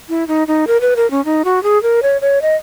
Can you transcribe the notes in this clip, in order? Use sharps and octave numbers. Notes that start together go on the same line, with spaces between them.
E4
D#4
D#4
A#4
B4
A#4
C#4
D#4
F#4
G#4
A#4
C#5
C#5
D#5